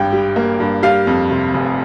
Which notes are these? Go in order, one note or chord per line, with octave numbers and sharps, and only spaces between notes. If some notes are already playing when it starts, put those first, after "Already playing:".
Already playing: G#1 G2 G5
G3
A#3
G2
G3 F5
F2
C3
F1